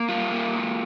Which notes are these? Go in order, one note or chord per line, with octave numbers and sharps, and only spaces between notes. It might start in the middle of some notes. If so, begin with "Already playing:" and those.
Already playing: A#3
G3 F4
A#3
G#3